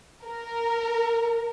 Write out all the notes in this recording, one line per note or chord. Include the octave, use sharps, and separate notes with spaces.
A#4